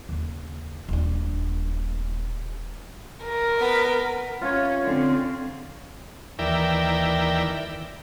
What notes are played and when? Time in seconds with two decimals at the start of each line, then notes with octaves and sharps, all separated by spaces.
0.09 D#2 C#3
0.89 D#1 D4
3.25 A#4
3.59 B3 B5
4.42 C#4 F4 C#5
4.83 D3 C4
6.39 D#2 E3 A#4 D5 E5 G5